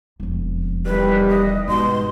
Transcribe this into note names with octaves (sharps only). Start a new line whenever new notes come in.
E1 F2
D#3 E3 G3 B4
D#5
G#2 B2 C6